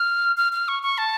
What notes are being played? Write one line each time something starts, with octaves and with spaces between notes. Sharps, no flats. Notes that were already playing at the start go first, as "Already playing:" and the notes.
Already playing: F6
F6
F6
C#6
C#6
A5